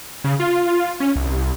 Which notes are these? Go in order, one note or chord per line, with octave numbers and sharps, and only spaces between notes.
C#3
F4
C#4
C2